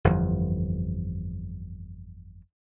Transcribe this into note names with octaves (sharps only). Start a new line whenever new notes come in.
G1 F2 E3